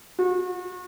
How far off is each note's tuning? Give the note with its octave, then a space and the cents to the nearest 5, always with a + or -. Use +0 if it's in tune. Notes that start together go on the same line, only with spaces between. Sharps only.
F#4 -35